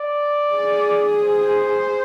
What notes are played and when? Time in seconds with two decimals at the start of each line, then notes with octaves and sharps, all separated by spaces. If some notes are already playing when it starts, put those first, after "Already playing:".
Already playing: D5
0.55 G#4
1.23 C5